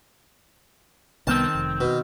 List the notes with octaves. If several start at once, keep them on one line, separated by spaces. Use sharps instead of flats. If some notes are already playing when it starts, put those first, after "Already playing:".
C2 D#3 B3 C4 A5
F1
B2